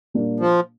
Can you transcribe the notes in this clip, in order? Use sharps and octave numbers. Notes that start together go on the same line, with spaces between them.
A#2 G3 A#3 D4
F3